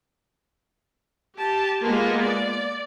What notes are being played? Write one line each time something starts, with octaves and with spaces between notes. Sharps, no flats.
G4 A5
G#3 A#3 B3 F4
D5